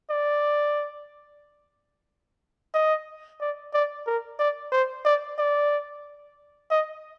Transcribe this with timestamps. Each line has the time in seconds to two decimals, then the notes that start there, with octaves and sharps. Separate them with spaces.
0.10 D5
2.74 D#5
3.41 D5
3.74 D5
4.07 A#4
4.39 D5
4.72 C5
5.05 D5
5.38 D5
6.71 D#5